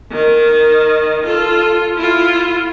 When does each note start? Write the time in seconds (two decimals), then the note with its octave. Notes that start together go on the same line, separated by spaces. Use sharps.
0.11 D#3
1.25 F4 A4
1.96 E4 F4